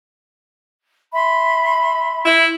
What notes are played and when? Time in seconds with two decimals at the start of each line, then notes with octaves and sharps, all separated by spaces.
1.14 E5 B5 C6
2.25 E4